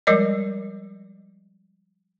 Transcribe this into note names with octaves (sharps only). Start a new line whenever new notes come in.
F3 G3 G#3 A#4 D5 D#5